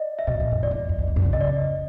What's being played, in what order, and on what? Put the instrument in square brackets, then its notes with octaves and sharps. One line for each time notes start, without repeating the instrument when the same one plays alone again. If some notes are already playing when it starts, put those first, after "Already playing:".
Already playing: [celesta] D5 D#5
E5
[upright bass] B2 [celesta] D#5
[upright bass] A#2
F2
[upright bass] F2 [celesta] D5
[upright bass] E2
F#2
F2
E2
F#2
C3
[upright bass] C#3 [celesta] D#5
[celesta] D5
D#5